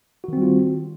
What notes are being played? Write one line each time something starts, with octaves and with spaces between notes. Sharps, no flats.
D#3 G3 C4 F4 F#4